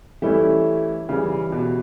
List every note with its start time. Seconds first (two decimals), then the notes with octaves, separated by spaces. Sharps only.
0.22 E3 G3 A3 C#4 E4
1.08 C#3 E3 G3 C#4 E4
1.52 B2